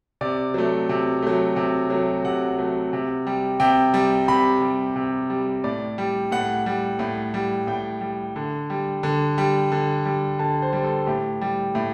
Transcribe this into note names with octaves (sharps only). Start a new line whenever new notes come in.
C3 D5
F#3 A3
C3
F#3 A3
C3
F#3 A3
C3 F#5
F#3 A3
C3
G3
C3 G5
G3
C3 B5
G3
C3
G3
A2 D5
G3
A2 F#5
G3
A2
G3
A2 G5
G3
D3
G3
D3
G3
D3
G3
D3 A5
C5
G3
A4
A2 G4
G3
A2